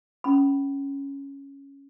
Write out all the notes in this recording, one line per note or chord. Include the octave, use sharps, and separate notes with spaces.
C#4 B5